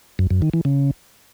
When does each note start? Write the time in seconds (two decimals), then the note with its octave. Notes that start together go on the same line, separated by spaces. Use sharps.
0.19 F#2
0.31 F#2
0.42 D#3
0.54 E3
0.65 C#3